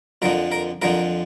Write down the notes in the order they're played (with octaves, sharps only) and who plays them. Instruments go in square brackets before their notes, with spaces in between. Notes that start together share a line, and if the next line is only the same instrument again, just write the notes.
[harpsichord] F2 D3 F3 A#4
A#4
F2 D3 F3 A#4